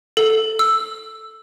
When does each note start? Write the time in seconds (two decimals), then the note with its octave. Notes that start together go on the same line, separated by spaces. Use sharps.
0.17 A4
0.59 E6